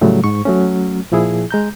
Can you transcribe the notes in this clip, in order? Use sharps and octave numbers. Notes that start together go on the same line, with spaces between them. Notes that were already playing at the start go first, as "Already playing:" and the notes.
A2 C#3 F#3 G3 A3
G#2 C#6
F#3 A3 C#4
A#2 F3 E4 G#4
G#3 A#5 G6